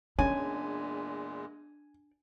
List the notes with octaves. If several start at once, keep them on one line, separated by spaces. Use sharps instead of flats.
E2 A#2 G#3 C#4 D4 C#5 G#5